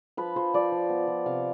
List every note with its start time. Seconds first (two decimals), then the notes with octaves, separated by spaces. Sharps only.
0.17 F3 B4
0.36 F3 C5
0.54 F3 D5
0.72 F3
0.89 B3
1.08 F3
1.26 C3 F5